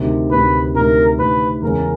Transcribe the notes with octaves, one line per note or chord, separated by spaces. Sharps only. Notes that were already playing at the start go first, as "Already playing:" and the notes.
Already playing: D2 C3 D#3
D2 C3 D#3 B4
D2 C3 D#3 A#4
D2 C3 D#3 B4
E2 C#3 E3 G#3 C#4 A#4